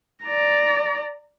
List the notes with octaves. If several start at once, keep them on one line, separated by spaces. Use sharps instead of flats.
D5 A#5